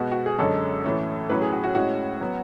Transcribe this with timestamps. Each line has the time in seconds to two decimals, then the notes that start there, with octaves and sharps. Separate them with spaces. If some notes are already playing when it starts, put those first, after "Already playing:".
Already playing: B2 G#3 B3 F#4
0.11 F#4
0.26 G#4
0.39 F#2 D3 G#3 C#4 A4
0.84 A2 E3 A3 C#4
1.30 A2 F#3 C#4 B4
1.42 G#4
1.52 F#4
1.64 F#4
1.75 A2 G#3 C#4 F#4
2.21 F#3 B3